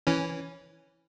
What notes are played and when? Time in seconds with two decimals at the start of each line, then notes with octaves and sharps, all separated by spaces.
0.07 E3 C#4